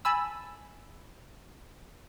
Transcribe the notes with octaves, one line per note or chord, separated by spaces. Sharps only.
G#5 A5 B5 E6